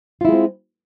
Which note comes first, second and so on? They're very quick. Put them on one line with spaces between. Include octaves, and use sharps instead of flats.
F4 E4 G#3 C4